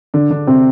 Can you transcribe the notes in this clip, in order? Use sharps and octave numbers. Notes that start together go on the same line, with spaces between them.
D3 D4
D3 D4
C3 C4